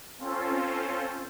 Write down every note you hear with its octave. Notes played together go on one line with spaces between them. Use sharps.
C4 C#4 F4 A4 C5